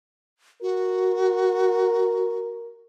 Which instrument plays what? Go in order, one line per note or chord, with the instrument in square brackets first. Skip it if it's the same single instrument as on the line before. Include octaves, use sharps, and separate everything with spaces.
[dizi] F#4 [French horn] A#4